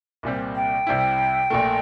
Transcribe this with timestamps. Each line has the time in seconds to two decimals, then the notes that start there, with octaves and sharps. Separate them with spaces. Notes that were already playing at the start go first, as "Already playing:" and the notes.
0.23 C2 A#2 G3 C4
0.56 G5
0.87 C2 C3 G3 C4 E4
1.50 A#1 A#2 A3